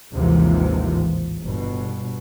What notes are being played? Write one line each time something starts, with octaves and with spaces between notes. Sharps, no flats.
A1 D#2 G#2 C3 E3 F3
G1 G2 B2